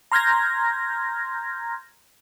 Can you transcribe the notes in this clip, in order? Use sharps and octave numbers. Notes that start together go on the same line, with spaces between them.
A#5 C6 F6 G6 G#6 A#6